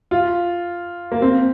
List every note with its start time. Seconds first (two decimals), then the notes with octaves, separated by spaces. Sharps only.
0.11 F4
1.12 A#3
1.22 C4